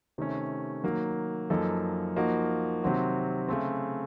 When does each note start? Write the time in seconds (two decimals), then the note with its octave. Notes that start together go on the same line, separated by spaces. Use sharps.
0.18 C3 D#3 A3 C#4
0.84 D#3 F#3 A#3
1.50 F#2 F3 A#3 D#4 A4
2.17 F3 A#3 D#4 F#4
2.83 C3 D#3 F#3 C4 F#4
3.48 C#3 A3 C4